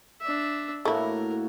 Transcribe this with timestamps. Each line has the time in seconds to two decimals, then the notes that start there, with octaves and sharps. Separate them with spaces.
0.21 D4 E5
0.85 A2 A3 A#3 E4 F#4 A#4